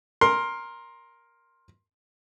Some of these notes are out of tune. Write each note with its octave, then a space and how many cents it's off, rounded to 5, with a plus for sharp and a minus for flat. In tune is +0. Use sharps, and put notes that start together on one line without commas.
A#4 +5 C6 +15